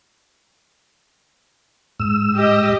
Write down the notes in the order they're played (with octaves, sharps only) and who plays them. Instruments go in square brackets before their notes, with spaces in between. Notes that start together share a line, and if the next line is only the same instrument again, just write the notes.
[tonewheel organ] G#2 E6
[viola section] G4 D#5